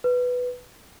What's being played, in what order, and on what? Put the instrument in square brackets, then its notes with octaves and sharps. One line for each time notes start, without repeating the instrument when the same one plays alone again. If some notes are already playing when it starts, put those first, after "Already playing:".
[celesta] B4